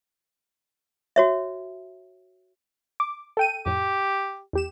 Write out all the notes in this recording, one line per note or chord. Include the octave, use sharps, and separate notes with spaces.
F#4 C#5 E5
D6
A4 G5 D#7
F2 A2 G4
E2 G4 E7